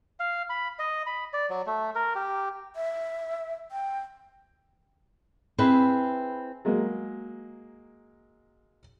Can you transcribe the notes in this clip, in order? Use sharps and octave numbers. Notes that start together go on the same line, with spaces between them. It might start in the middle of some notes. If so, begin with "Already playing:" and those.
F5
B5
D#5
B5
D5
F#3
A3
A#4
G4
E5
G5
C4 E4 G#4 B4
F#3 G#3 A#3